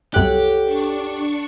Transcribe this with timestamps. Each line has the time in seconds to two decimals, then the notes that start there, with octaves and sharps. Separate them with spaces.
0.14 C2 F#2 G4 A4 C#5 F#5 F#6
0.65 D4 C#6 C#7